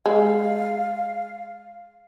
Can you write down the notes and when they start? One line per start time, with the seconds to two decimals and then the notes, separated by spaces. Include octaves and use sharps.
0.06 G#3 F5